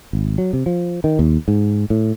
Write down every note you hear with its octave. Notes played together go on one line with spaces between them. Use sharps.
G#1
F#3
C3
F3
D#3
D#2
G#2
A2